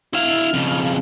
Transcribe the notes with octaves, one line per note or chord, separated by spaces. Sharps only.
E4 F5 F6
F2 C#3